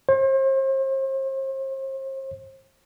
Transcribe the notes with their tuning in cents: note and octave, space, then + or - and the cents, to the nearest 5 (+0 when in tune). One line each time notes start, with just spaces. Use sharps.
C5 +40